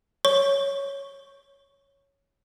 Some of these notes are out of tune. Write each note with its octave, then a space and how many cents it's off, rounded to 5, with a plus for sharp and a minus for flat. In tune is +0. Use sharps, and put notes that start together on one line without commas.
C#5 +0 C#6 +0